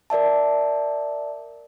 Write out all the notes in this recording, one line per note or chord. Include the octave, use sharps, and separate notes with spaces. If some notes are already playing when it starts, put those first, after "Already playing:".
A#4 D5 E5 A5